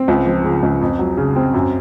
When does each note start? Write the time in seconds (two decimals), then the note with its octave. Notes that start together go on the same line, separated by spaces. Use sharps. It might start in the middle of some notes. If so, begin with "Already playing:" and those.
Already playing: C4
0.08 C#2
0.26 F3
0.44 C#3
0.63 C#2
0.81 F2
0.99 F#3
1.17 C#3
1.36 C4
1.54 F#2